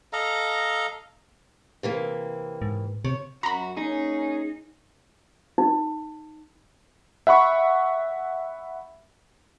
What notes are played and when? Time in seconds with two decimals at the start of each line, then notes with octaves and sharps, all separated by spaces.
0.13 A4 D#5 F5 A#5
1.83 C3 E3 A#3
2.62 G#2
3.05 C3 C#5
3.43 F#2 F#4 A#5 B5
3.77 A#3 C#4 D#4 G#4
5.58 D#4
7.27 E5 F#5 B5 C#6